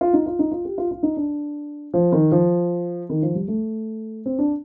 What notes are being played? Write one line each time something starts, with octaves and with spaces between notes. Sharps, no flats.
F4
D#4
F4
D#4
F4
G4
F4
F4
D#4
D4
F3
D#3
F3
D#3
F3
G3
A3
C4
D4